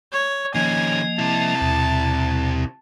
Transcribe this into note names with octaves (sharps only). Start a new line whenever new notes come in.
C#5
D#3 F3 A#3 C#4 D#5 G#5
C3 E4 A5
D#2 B2